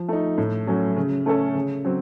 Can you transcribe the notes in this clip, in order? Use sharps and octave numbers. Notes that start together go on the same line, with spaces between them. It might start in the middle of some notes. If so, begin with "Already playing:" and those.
Already playing: F3
A3 D#4
A2
F#3 A3 C#4
C#3
A3 C#4 A4
C#3
F#3 C4